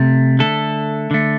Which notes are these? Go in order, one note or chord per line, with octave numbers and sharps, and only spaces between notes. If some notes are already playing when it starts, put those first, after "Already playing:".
Already playing: C3 A3
D3 A3 A4
D3 A3